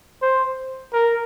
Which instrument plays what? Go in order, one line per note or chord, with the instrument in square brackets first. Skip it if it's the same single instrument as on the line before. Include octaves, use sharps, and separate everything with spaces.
[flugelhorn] C5
A#4